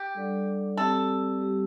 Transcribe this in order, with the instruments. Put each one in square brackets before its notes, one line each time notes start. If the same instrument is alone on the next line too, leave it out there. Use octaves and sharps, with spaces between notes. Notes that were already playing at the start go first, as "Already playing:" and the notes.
Already playing: [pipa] G4
[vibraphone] G3 D4 A4 D5 F#5
[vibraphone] G3 C4 G4 D5 [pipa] A4
[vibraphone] G3 C4 G4